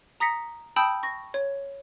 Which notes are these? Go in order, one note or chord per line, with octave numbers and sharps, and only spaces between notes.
A#5 D#6 A#6 B6 C#7
G5 A5 B5 D#6 E6 G6
C#6 A#6
C#5